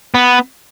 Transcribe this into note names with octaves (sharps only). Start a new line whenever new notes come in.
B3